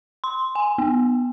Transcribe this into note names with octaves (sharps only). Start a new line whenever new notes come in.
C6
G#5
B3